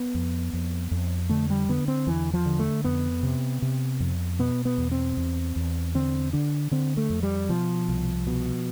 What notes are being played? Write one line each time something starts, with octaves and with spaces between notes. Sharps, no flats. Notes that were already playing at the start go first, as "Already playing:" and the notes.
Already playing: B3
F2
F2
F2
D3 A3
G3
D3 B3
C4
E2 E3
F3
D3
A3
F2 B3
C3
C3
F2
B2 B3
B3
E2
C4
E2
E2
D3 C4
D3 D4
D3 C4
A3
F2
G3
B2 F3
C2
B2